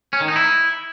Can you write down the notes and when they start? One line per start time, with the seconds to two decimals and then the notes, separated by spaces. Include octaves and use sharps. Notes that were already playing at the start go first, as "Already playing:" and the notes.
0.13 C#4
0.21 D#3
0.28 D#4
0.36 E4